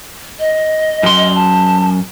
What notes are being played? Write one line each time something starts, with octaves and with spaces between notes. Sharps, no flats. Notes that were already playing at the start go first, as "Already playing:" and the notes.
D#5
F#2 C6
A5